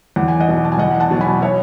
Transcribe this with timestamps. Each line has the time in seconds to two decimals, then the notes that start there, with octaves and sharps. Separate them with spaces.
0.16 E2 F#5
0.28 G#5
0.40 D#5 F#5
0.48 B2 F#3
0.65 A5
0.72 G#5
0.79 E2 D#5 F#5
1.00 F#5 A5
1.10 B2 F#3
1.21 G#5 B5
1.42 C#5 E5